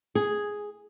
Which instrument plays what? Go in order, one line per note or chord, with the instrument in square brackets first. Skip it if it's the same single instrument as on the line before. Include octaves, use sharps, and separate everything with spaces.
[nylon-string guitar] G#4